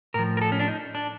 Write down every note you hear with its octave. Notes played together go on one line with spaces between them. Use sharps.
A2 F3 A#4
A#4
A4
C#4
D4
D#4
D4